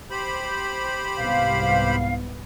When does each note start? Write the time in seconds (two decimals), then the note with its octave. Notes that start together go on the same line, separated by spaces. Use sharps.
0.11 G4 C5 B5
1.18 C2 G#2 B3 F5